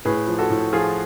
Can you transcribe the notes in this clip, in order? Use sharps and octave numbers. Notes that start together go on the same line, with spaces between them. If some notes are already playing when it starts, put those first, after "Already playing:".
A2 G#4 B4
F3
F#4 A4
A2
F3 F4 G#4